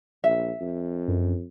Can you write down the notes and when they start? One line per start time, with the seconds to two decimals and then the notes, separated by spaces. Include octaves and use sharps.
0.24 A#1 E5
0.61 F2
1.08 F#2